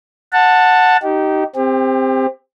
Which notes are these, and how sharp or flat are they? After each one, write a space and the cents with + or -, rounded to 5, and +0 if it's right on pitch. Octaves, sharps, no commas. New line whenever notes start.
F#5 -10 A5 +10
D#4 +0 G4 -20
C4 +0 G4 +35